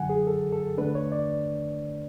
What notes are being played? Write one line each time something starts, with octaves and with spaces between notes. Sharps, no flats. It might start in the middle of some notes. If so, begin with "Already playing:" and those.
Already playing: F#2 D3 F#3 F#5 G#5
G#4
A4
A4
E2 D3 A3 D4 B4
C#5
D5